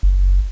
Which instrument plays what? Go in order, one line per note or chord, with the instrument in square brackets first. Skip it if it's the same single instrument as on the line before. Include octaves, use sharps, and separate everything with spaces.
[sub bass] F#1